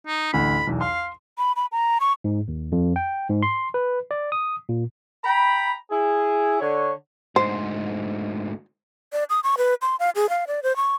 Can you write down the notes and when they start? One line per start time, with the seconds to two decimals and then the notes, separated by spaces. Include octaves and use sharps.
0.07 D#4
0.33 A1 D2 B5
0.67 B1 E2
0.81 F5 C6
1.38 B5
1.56 B5
1.72 A#5
2.01 C#6
2.24 G#2
2.48 D#2
2.72 F2
2.96 G5
3.29 G#2
3.43 C6
3.74 B4
4.11 D5
4.32 D#6
4.69 A#2
5.24 G5 A#5 B5
5.90 E4 G#4
6.60 D3 C#5
7.36 D2 G#2 C5
9.13 D5
9.30 D#6
9.44 C#6
9.58 B4
9.82 C6
10.00 F5
10.16 G#4
10.29 F5
10.47 D5
10.63 C5
10.76 C#6